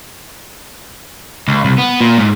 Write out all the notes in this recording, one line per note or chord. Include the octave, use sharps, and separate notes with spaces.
C#2
C2
B3
A#2
G#2